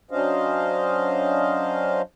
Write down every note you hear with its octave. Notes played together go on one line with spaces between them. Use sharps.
F#3 C#4 D4 C5 D#5 F5